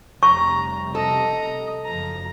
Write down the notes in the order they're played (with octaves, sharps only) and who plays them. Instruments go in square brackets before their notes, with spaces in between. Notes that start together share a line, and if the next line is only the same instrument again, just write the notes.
[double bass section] F1 C3 G3 [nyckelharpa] A#5 [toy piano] C#6
[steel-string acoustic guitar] A4 [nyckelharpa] D#5 A#5
[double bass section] F#1 F3 [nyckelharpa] A#5